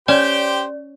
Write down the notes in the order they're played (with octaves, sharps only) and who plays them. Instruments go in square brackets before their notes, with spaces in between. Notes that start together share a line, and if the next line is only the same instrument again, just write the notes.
[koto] C#4 [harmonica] G4 C5 G5 [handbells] D5